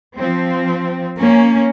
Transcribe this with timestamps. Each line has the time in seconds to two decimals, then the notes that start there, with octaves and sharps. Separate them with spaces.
0.15 F3 C4
1.19 A#3 C#4